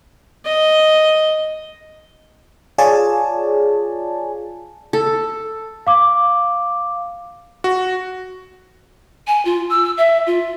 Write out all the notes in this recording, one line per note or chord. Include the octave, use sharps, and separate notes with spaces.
D#5
F4 G#4 C#5 D5 G#5 A5
A4
F5 D6
F#4
G#5
F4
E6
E5
F4